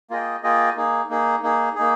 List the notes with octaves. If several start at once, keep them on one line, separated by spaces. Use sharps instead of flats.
A#3 F4 G#4 D#5 G5
A#3 F4 G#4 D#5 G5
A#3 D#4 G#4
A#3 D#4 G#4
A#3 D#4 G#4
A#3 D#4 G#4